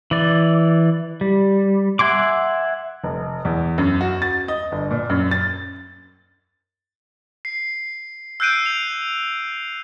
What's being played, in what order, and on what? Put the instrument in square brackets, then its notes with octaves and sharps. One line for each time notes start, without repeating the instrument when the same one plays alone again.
[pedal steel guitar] E3 D5
G3
E5 F#5 G#5 C6 D6
[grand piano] F1
E2
F#2
F#4
A6
D#5
G1
A#2
F#2
A6
[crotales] C7
E6 F#6 G6 C7 D7 D#7
F7